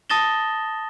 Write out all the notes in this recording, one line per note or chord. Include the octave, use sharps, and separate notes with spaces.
A5 D#6 A6 A#6 E7 G7